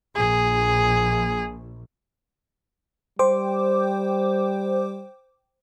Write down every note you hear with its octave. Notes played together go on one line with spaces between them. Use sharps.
A#1 G#4
G3 C5 G5 D6